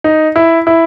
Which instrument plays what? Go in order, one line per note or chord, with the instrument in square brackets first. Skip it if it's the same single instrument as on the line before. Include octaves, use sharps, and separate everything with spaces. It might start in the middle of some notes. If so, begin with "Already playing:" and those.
[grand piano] D#4
E4
E4